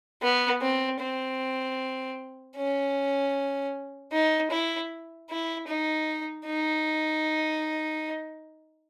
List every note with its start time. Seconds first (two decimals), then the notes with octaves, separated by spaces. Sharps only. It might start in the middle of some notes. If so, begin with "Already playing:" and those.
0.22 B3
0.61 C4
1.00 C4
2.56 C#4
4.12 D#4
4.51 E4
5.30 E4
5.68 D#4
6.46 D#4